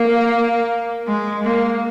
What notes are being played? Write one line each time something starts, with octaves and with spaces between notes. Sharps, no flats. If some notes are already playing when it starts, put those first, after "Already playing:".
Already playing: A#3
G#3
A#3